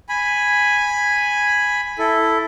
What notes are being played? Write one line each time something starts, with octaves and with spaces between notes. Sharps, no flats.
G#5 B5
E4 A4